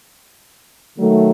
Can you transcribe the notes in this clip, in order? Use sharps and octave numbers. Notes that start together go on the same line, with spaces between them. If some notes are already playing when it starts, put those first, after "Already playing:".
D#3 F#3 A3